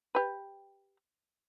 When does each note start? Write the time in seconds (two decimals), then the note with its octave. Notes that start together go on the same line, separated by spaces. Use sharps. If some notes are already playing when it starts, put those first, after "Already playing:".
0.15 G4 B4